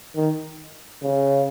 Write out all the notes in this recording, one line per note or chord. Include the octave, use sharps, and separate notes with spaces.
D#3
C#3